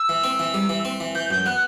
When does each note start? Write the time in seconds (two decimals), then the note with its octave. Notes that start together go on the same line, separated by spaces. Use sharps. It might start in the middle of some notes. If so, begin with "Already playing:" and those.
Already playing: E6
0.09 E3
0.24 C4
0.39 E3
0.54 G3
0.69 E3
0.85 C4
1.00 E3
1.15 E3 G6
1.30 F#2 G6
1.46 B3 F#6